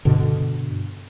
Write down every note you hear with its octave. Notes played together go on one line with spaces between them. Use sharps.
G2 B2 D3